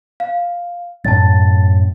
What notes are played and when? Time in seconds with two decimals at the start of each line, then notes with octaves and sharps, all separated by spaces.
0.20 F5
1.05 F#2 A2 F#3 A5 A6